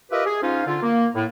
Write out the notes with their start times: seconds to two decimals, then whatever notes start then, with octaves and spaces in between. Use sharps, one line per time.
0.12 F4 G4 A#4 B4 D#5 E5
0.26 G#4
0.42 G#2 C#4 D#4 F4 F5
0.66 D3 F4
0.82 A#3
1.15 A2